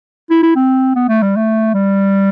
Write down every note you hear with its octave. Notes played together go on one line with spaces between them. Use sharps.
E4
E4
C4
B3
A3
G3
A3
G3